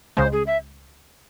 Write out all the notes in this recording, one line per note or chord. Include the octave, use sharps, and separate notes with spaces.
C#2 C#3 G#3 C5
G#4
E5